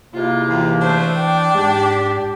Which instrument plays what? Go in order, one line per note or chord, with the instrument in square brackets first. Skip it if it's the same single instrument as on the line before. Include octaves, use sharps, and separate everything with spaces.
[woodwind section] G#2 C3 A#3 [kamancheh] E4 F4
[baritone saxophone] D#2 [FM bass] E3
[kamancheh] A3 C5 [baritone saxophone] D4
[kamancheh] D5 G5
[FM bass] G#2 [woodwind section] G4